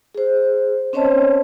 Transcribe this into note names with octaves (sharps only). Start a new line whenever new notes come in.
G#4 C5
C4 C#4 C5 C#5 D#5 A5